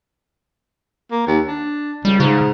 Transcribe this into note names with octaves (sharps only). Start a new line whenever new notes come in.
A#3
D#2
D4
C#2 G3
G#2 C#3